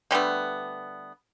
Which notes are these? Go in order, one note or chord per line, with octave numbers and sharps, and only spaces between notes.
D3 G3 A3 B3